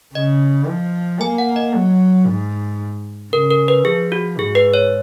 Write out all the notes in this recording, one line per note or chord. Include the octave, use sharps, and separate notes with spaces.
C#3 D#5
F3
A#3 G#5
F#5
D#5
F#3
G#2
C#3 A#4
A#4
B4
F3 G#4
F#4
G#2 G#4
B4
C#5